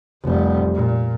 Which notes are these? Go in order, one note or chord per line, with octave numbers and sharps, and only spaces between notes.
F1 G3
A#2